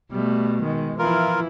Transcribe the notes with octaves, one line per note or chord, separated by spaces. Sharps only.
B2 G3 A3
D#3 G#3
E3 F3 E4 F4 A#4